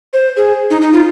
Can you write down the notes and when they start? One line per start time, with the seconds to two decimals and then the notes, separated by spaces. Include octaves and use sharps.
0.13 C5
0.37 G#4
0.70 D#4
0.81 D#4
0.93 F4